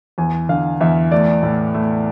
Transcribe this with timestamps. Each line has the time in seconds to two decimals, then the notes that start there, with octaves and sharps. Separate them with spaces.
0.18 E2 G#5
0.49 D3 F5
0.81 E2 E5
1.12 A3 D5
1.43 A2
1.74 A3